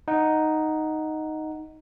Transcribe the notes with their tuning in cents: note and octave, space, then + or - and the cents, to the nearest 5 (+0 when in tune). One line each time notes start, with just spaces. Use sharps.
D#4 +0 F#5 +0